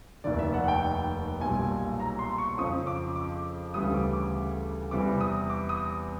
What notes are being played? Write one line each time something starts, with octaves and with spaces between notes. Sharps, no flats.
F1 D#2 D#3 D5
E5
F#5
G5
B1 A#2 G3 G#5
A#5
C6
C#6
F2 C#3 F3 D#6
D6
D6
D2 C#3 E3 G3 D#6
D6
D6
E2 C3 E3 G3 D6
D#6
D6
D#6